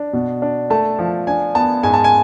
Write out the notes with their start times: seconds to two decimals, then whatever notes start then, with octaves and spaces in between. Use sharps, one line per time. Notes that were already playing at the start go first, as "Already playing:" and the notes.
Already playing: D4
0.13 B2
0.42 D4
0.70 A3 A5
0.99 F3
1.27 D4 G#5
1.55 B3 A5
1.83 G#2 G#5
1.94 A5
2.04 G#5